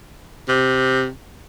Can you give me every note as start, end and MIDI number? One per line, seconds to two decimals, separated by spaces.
0.48 1.09 48